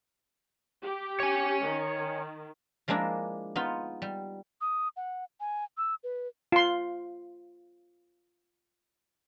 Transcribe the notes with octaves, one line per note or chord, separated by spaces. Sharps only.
G4
C#5 G#5
D#3
F3 G#3 A#3 D4 E4
B3 D#4 F4
G3
D#6
F#5
G#5
E6
B4
F4 C6